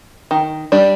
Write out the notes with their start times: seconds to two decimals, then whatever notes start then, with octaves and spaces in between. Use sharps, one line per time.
0.31 D#3
0.72 G3 D4